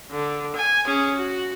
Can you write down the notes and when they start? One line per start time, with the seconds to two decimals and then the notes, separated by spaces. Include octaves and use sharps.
0.11 D3
0.56 G#5
0.86 C#4 G#4
1.15 F#4